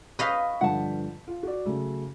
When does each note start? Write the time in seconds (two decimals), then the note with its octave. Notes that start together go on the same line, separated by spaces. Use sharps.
0.19 B4 D#5 F5 C#6 G6 B6
0.61 G2 D3 F3 F#5 A5
1.27 F4
1.43 F#4 D5
1.66 C#3 F#3 A3